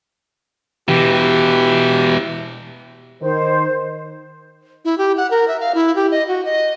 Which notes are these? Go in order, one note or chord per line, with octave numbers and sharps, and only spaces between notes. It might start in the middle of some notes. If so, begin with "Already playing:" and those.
B2 E3 G4
G4
D#3 C5
E4
G4
F#5
A#4
E5
F5
E4
G4
D#5
F#4
D#5